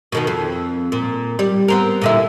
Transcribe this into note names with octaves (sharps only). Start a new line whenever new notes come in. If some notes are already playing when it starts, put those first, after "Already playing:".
B2 D#3 B3
F2
A#2
G3
B3 C4 A#4
A#2 D3 E4